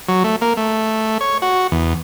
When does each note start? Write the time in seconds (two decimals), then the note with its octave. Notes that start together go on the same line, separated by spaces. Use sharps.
0.08 F#3
0.24 A3
0.41 A#3
0.57 A3
1.21 C#5
1.42 F#4
1.72 E2